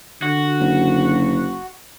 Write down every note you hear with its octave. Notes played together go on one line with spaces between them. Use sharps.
D3 F#4
F#1